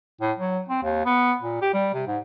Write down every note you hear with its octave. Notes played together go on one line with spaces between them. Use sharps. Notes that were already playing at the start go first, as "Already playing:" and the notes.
A2
F#3
C4
D#2
B3
A#2
G4
G3
C3
G#2